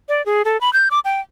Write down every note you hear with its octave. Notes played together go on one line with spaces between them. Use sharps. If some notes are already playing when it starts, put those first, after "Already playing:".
D5
G#4
A4
B5
G6
D6
G5